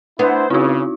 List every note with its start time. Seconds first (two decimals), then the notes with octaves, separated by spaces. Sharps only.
0.19 B3 D4 E4 C5
0.50 C#3 C4 D#4 E4 F#4 D6